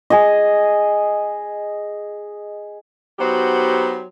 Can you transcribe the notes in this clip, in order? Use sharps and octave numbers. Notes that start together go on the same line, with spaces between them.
G#4 D#5
F#3 B3 D#4 F#4 G4 C5